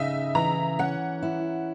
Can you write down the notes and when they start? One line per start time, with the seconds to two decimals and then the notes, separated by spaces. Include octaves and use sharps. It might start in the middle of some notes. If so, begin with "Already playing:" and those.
Already playing: C#3 D#4 D#5 E5
0.35 E3 A#5
0.79 C#4 F#5
1.23 E4